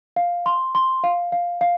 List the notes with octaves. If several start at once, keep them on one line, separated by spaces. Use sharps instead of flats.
F5
C6
C6
F5
F5
F5